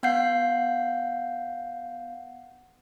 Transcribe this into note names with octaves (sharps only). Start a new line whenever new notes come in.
B3 F5 F#5 G6 C7